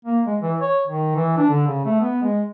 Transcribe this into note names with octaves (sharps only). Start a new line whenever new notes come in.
A#3
G#3
E3
C#5
D#3
E3
D4
D3
C#3
A3
B3
G#3